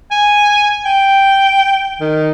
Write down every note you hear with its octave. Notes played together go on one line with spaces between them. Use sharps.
G#5
G5
D#3